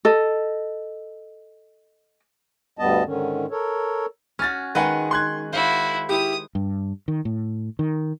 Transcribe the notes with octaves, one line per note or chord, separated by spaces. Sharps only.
A4 D#5
D2 G2 G3 B3 D#5 A5
G#2 D3 D#3 C#4
A4 A#4 C#5
C#4 F#4 F6 A6
D#3 G#3 B4 F#5 G#5
C6 F#6 G#6
E4 F#4 C5 F5
E4 G4 D#6
G2
D#3
A2
D#3